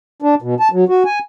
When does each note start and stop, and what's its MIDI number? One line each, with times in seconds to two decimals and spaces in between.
0.22 0.35 62
0.42 0.55 47
0.60 0.68 81
0.72 0.85 54
0.89 1.03 66
1.05 1.19 80